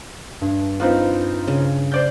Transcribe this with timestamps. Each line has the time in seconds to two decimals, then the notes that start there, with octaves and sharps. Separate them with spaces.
0.41 G2
0.80 C4 D#4 F4 B4
1.47 C#3
1.92 C5 D5 G6